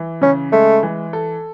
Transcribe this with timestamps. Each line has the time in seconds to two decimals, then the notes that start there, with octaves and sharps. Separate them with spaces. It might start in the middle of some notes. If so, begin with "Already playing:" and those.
Already playing: E3
0.21 C#3 C#4
0.52 G#3 A3
0.83 E3
1.13 A4